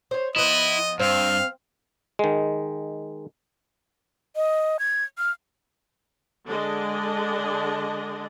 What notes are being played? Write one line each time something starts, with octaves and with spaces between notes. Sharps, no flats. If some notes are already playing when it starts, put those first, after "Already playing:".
C5 C#5
F3 B3 E4 D#5
G2 C4 F5
D#3 G#3
D#5
G#6
F6
D3 G#3 D4 D#5